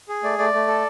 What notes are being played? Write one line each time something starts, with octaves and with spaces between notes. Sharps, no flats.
G#4
A3 D5
A3 D5
A3
A4